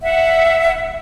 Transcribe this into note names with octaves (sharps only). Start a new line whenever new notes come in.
E5 F#5